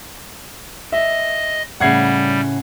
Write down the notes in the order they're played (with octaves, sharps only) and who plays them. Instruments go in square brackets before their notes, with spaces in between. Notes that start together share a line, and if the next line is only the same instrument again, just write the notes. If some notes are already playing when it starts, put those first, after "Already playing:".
[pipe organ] D#5 [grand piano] E5
[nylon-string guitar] A2 C#3 [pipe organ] G3 [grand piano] F#5 G#6 C7